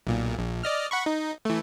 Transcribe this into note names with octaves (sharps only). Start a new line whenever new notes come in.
B1 A#2
A#1
D5 D#5 F6
F#5 B5 C#6
D#4
E3 A3